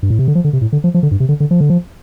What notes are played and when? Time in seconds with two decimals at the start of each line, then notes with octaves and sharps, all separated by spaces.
0.03 G2
0.10 A2
0.19 C3
0.28 D3
0.35 F3
0.44 D3
0.53 C3
0.61 A2
0.72 D3
0.84 F3
0.94 F3
1.03 D3
1.11 G2
1.20 C3
1.29 D3
1.40 D3
1.51 F3
1.61 D3
1.70 F3